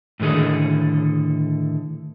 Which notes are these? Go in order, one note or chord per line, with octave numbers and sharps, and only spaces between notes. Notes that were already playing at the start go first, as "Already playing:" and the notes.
A2 D3 D#3 G#4 A4